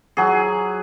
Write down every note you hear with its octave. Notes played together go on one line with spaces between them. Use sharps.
F#3 G#4